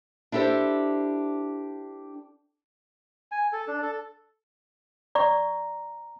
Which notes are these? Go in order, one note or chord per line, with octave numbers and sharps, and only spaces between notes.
D4 E4 G4 A4 C5
G#5
A4
D4
A4
D5 A#5 C#6